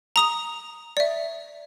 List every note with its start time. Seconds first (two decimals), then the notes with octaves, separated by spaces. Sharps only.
0.16 A#5 D#6 F7
0.97 D5 E5